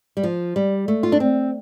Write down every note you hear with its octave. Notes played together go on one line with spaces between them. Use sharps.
G3
F3
G3
A3
F4
D4
C4